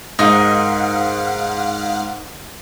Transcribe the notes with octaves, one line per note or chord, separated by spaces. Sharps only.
G#2 D#4 A#4 D#5 F5 F#5